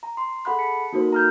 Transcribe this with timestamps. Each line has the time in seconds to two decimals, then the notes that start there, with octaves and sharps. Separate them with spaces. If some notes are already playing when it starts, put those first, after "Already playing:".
0.03 A#5
0.17 C6
0.45 G#4 A4 F#5 B5 F#6
0.58 A5 B6 C#7
0.93 A#3 D#4 F#4 A4 A#4 C5
1.12 A#5 F6 G6